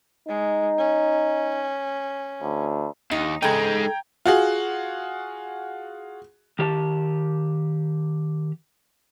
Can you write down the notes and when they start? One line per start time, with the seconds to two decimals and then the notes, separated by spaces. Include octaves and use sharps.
0.28 G#3 D#4
0.78 C#4
2.41 D2
3.11 D#2 D#4
3.43 E2 C#3 G#3 D#4 A4 G5 A#5 G#6
4.25 F4 F#4 G#4
6.59 D#3 G4 F5 A5